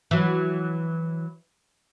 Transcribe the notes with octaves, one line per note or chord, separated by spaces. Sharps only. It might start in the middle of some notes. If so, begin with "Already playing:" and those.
E3 F#3